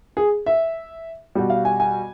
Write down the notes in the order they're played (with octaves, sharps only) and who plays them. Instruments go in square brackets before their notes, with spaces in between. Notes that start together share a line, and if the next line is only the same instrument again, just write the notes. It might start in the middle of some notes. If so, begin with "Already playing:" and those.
[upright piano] G#4
E5
B2 G3
F5
G#5
G#5